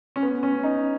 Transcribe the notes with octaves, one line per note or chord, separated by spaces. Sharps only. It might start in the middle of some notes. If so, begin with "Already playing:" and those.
C#4
B3
C#4
D#4